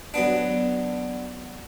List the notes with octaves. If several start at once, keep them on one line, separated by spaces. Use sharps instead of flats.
F#3 B3 D4